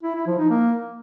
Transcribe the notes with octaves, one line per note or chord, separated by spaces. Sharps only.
E4
E4
F3
D#4
A#3